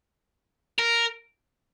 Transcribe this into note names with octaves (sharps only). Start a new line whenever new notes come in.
A#4